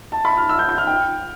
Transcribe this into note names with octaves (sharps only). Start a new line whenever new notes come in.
A5
B5
F6
E6
G6
G6
F6
G5